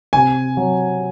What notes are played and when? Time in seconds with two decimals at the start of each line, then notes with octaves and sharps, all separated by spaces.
0.13 C3 G#5
0.57 F#3